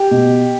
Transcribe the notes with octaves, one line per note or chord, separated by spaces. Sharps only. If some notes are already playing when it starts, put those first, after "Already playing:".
Already playing: G4
B2